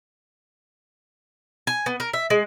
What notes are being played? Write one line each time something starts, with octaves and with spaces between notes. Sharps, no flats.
G#5
B3
A#4
E5
G#3